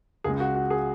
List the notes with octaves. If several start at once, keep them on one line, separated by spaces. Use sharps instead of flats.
C#2 C#3 G#3 G#4
F#4
F#4
G#4